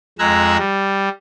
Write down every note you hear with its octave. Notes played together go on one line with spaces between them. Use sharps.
F2 G#3 A#5 E6 F#6 G#6
G3